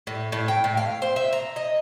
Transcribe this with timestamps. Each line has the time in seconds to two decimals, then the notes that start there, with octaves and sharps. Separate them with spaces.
0.07 A2
0.32 A2
0.48 G5
0.64 A2
0.77 F5
1.02 C5
1.16 E5
1.33 A#5
1.56 D#5